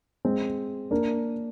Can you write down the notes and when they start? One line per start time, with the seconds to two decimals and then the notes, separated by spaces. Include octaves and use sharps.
0.25 G#3 C4
0.91 A#3 D4